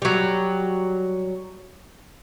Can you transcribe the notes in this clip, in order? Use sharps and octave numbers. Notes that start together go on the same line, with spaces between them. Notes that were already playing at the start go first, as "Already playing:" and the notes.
F#3 G3